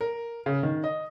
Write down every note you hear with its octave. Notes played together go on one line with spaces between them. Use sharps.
A#4
C#3
D#3
D#5